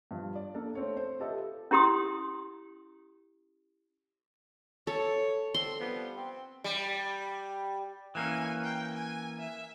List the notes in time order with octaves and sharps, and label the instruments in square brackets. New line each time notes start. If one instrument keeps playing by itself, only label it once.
[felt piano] G2 F3
D5
A#3 D4 A4
A3 C4 C#5
C5
F4 G4 A4 B4 D#5 E5
[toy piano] C#4 E4 G4 C6 D#6
[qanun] A4 [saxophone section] C#5
[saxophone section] D3 C4 A4 [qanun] C6
[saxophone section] F3 G3 B3
C4
[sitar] G3
[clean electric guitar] E3 A#3 C#4 [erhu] G#5
[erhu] G5
G#5
E5